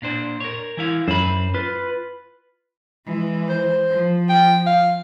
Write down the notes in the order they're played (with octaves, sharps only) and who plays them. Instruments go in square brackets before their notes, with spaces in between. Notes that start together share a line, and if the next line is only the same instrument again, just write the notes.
[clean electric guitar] A#2 D4 C5
A#4 C#5
E3 E4 F5
[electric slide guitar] F#2 [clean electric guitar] C5 B5
[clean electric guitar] F4 [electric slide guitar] B4
[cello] E3 G#3
[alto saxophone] C5
[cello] F3
[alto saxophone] G5
F5